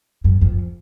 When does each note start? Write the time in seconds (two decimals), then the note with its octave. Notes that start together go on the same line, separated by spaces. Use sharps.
0.24 F#2
0.41 F2